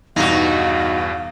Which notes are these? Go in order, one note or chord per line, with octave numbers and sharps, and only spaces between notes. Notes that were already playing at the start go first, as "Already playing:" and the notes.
E2 G2 B2 D#4 F#4 F5